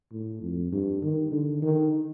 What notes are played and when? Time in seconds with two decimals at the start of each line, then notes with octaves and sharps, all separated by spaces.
0.13 A2
0.42 F2
0.72 G2
1.02 D#3
1.32 D3
1.62 D#3